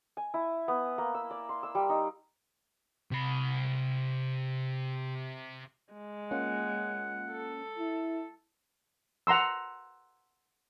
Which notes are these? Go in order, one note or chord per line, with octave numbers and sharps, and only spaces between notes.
G#5
E4
B3
A#3
E6
D5
C6
E6
G3
D#4
C3 B5
G#3
A#3 C#4 F4 F#5
A4
E4
F#5 A#5 C6 E6